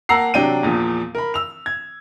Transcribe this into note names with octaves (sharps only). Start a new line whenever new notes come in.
A#3 F#5 A5 A#5 E6 C7
C3 F#3 D4 G5 D#7
E2 A#2 F3
A#4 B5
E6 F7
G#6